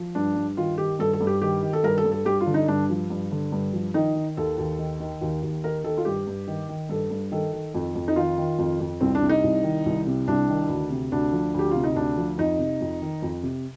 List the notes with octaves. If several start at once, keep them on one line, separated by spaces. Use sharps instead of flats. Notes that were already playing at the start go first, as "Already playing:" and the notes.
Already playing: F3
G2 D4
G2
D#3 F4
D#3 G4
G2 A4
A4
G2
G4
D#3 G4
D#3
A4
G2 A#4
A4
G2
A4
G2 G4
F4
D3
D#4
G2 D4
F3
G2
D3
G2
F3
D#3 D#4
D#3
D#2 A4
D#2
D#3
D#3
D#2
D#2
D#3 A#4
D#3 A4
F4
G2 G4
G2
D#3
D#3
G2 A4
G2
D#3 A4
D#3
F2
F2
D#4
D#3 F4
D#3
F2
F2
C2 C4
D4
C3
D#4
C2
D#3
C2
C3
C2 D4
D#3
D2
C3
D2 D4
F3
D2 G4
C3 F4
D#4
D2 D4
F3
F2 D#4
C3
F2
D#3
F2
C3